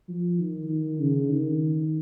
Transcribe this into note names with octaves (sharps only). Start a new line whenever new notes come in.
F3
D#3
D#3
C#3
D#3